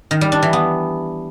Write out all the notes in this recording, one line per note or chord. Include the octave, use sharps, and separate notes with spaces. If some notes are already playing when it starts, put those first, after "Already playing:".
D#3
G3
D4
E3
B3